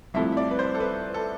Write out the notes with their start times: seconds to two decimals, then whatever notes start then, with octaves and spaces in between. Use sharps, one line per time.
0.14 C2 C3 F3 A3 E4 E5
0.32 E5
0.37 D5
0.51 B4
0.59 C5
0.75 A4
0.80 B4
1.14 A4